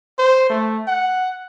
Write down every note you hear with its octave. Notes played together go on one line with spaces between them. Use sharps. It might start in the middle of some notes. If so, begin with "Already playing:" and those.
C5
A3
F#5